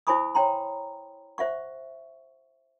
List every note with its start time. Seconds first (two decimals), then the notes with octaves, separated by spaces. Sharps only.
0.07 E4 C5 G#5 B5 C#6 D#6
0.35 C#5 G5 A#5 C6
1.38 C5 E5 F#5 C#6